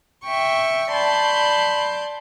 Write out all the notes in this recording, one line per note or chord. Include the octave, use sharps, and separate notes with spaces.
E5 G5 C#6
D5 A5 B5 C6 G6